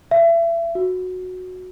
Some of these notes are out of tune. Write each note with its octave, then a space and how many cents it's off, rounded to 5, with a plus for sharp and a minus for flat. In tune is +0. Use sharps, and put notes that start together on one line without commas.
E5 +30
F#4 -10